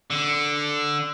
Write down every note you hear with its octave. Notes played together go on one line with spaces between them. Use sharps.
D3